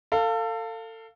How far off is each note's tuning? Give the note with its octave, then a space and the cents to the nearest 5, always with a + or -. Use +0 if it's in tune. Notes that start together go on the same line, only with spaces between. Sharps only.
A4 +30 F5 +0